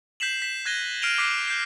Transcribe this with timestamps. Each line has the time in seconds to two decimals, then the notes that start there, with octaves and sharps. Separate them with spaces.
0.20 G6 B6 C7 E7 F#7
0.42 B6 E7
0.65 F#6 G#6 A#6 D#7 G7
1.02 F6 C7 D7 D#7 F7 G7
1.18 D6 F#6 B6 C7
1.47 G6 C7